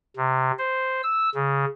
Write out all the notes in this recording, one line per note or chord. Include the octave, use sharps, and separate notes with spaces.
C3
C5
E6
C#3